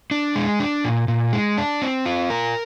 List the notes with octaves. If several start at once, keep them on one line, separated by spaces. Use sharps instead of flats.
D4
G#3
D4
A#2
A#2
G#3
D4
C4
F4
A#4